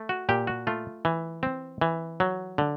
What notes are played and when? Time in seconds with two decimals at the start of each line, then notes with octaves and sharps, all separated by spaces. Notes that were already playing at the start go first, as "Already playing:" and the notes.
Already playing: A3
0.09 F#4
0.29 A#2 G4
0.47 F#4
0.67 A3 F4
1.05 E3
1.43 C4
1.81 E3
2.20 F#3
2.58 D3